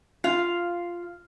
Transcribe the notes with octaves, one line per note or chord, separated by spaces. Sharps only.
F4 F5